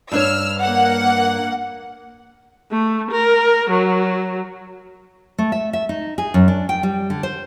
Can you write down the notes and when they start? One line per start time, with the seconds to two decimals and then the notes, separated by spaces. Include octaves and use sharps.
0.12 G2 D4 C#5 E6 F6
0.61 A#3 F#5
2.71 A3
3.11 A#4
3.69 F#3
5.38 A3
5.52 E5
5.73 E5
5.89 D#4
6.18 G#4
6.34 F#2
6.48 D4
6.69 G5
6.83 G3
7.10 D3
7.23 C5